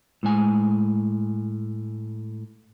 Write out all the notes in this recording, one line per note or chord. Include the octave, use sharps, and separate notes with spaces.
A2 G#3 G#5